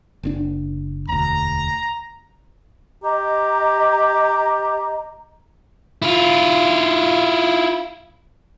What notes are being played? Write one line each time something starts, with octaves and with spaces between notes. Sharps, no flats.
F#1 C3 D4
E1 D2 A#5
G4 D#5 A#5
E4 F4